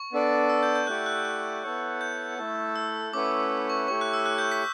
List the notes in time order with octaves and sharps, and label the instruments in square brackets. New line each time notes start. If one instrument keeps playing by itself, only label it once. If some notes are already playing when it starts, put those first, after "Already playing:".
Already playing: [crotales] C#6
[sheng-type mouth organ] B3 D4 A4 D5
[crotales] E6
G6
G6
[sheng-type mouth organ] A3 E4 G4 D5 F#5 [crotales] F#6
[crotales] F#6
G6
F#6
[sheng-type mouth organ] B3 E4 A4 C#5 F#5
[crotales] G6
[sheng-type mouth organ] A3 E4 A4
[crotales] E6
[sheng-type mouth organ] A3 C#4 E4 B4 F#5 [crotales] D6
[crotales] D6
C#6
[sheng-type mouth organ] A3 E4 G4 C#5 [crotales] C#6
[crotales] F#6
E6
F#6
G6
B6